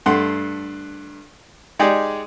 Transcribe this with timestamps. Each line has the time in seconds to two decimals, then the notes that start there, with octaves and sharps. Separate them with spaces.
0.06 G2 A3 F#5 C6
1.79 G#3 D#4 G4 G#4 D5